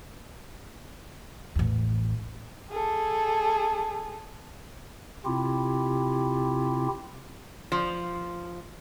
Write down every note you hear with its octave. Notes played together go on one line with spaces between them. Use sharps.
A1 E2
G#4 A4
C3 C4 E4 F4 G4
F3